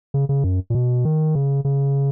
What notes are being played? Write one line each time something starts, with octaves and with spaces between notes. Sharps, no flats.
C#3
C#3
F#2
A#2
B2
D#3
C#3
C#3